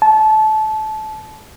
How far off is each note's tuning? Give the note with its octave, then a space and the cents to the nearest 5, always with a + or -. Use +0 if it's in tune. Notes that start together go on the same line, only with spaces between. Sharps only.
A5 -25